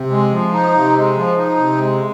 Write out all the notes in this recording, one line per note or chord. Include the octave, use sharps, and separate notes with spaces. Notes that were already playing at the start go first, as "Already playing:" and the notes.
Already playing: C3
G#3
F3
D#4
C3
G#3
F3
D#4
C3
G#3